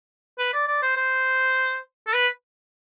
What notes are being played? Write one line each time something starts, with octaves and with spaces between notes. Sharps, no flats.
B4
D5
D5
C5
C5
A4
B4